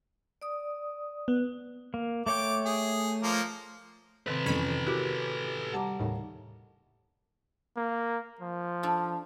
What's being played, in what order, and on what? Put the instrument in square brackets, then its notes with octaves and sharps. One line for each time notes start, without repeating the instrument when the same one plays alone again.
[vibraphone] D5 D#6
[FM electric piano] B3
[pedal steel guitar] A#3
[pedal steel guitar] A3 C#5 G5 [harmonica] D6
[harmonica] G#4
F3 A#3
[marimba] C3 D#3 C4 [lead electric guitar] A4 B4
[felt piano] F2 E3 [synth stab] C#4 B5 B6
[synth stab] E4 [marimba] F#4 [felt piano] G4 A#4 D6
[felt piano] G3 A#5 [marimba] F#5 A5 D6
[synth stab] D#2 A2 C#3
[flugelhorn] A#3
F3
[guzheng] D4 F4 A4